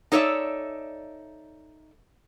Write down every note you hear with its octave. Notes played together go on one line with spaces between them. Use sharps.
D#4 A4 C#5 D5 E5